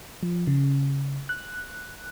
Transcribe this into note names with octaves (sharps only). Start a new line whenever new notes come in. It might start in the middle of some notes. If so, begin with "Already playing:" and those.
F3
C#3
F#6